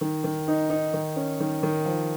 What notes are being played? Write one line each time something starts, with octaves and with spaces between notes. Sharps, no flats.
D#3
D#3
D#4
D#4
D#3
C#4
D#3
D#3
F3